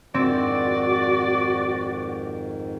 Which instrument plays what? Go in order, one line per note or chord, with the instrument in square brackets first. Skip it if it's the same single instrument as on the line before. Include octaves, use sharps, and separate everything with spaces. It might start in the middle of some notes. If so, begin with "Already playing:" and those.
[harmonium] F2 G#2 D#3 [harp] C4 [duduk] F#4 [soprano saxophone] D5